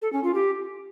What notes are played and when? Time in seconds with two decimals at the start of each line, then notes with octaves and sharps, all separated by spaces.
0.02 A4
0.13 C#4
0.24 F4
0.34 G4